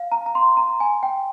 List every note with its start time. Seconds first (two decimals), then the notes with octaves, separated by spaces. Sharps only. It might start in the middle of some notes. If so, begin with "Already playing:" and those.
Already playing: F5
0.12 A#5
0.26 A#5
0.35 C6
0.57 A#5
0.80 G#5
1.03 G5